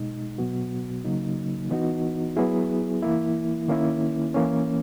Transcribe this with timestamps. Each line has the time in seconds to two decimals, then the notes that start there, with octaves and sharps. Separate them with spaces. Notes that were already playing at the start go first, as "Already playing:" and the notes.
Already playing: B2 G#3 D#4
0.38 B2 F#3 B3 F#4
1.04 C#3 F#3 A#3 D#4
1.70 E3 B3 D#4 F#4
2.36 F#3 B3 E4 G#4
3.02 E3 A#3 E4
3.68 D#3 A#3 C#4 E4
4.34 E3 A#3 C#4